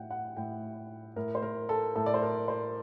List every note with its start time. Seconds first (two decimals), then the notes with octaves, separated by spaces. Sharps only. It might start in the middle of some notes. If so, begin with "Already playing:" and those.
Already playing: A2 F#5 G5
0.10 F#5
0.37 A2 G5
1.16 A2 A#4
1.35 C5
1.42 A#4
1.69 A4
1.95 A2 A4
2.06 D5
2.14 C5
2.22 A#4
2.48 C5